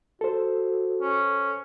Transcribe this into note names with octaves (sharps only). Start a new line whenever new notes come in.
F#4 A4 C5
C#4